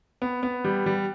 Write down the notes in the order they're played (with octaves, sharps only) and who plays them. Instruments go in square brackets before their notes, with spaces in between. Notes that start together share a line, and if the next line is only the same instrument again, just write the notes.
[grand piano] B3
B3
G3
G3